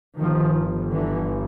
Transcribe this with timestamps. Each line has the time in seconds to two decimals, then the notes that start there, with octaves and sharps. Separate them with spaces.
0.18 G1 G2 D#3 F3
0.91 D3 E3